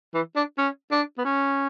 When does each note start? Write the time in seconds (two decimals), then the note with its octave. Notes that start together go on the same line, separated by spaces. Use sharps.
0.14 E3
0.36 D4
0.58 C#4
0.91 D4
1.18 B3
1.25 C#4